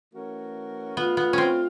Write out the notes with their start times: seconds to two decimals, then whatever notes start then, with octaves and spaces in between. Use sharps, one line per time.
0.14 E3 A3 C#4 F#4 A#4
0.96 A3 B3 D4 F4
1.17 B3
1.33 C4 C#4